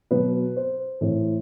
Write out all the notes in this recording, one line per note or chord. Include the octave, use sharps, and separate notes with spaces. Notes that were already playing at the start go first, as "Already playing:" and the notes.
B2 F#3 B4
C5
A2 E3